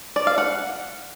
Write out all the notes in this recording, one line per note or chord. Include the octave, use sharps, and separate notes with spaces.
D5
F5
F#5